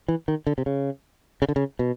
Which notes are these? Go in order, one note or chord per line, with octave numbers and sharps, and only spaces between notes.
E3
D#3
D3
C3
C#3
C#3
D3
C#3
B2